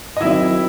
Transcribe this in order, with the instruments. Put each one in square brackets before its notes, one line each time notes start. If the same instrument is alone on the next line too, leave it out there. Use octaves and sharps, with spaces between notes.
[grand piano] D#5
[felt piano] D#3 F#3 C4 [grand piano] E4 E5